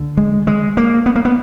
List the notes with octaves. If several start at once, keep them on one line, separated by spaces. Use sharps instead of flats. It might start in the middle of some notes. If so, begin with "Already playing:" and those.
Already playing: D3
G#3
G#3
A#3
B3
A#3
B3